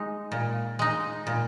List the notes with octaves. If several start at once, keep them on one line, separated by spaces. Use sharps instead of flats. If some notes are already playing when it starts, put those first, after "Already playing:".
Already playing: G#3 D#4
A#2
G#3 D#4
A#2